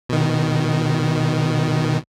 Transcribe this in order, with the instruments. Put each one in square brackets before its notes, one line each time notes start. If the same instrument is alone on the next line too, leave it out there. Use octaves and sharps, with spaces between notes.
[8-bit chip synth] B2 D#3